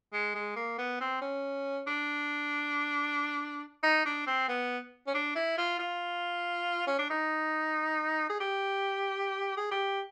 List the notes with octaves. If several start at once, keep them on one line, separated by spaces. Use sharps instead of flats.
G#3
G#3
A#3
B3
C4
C#4
D4
D#4
D4
C4
B3
C#4
D4
E4
F4
F4
C#4
D4
D#4
G#4
G4
G#4
G4